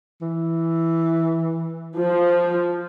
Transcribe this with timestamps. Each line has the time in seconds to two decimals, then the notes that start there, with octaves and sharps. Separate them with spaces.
0.22 E3
1.98 F3